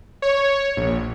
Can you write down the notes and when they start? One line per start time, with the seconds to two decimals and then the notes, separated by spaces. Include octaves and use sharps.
0.22 C#5
0.77 A#1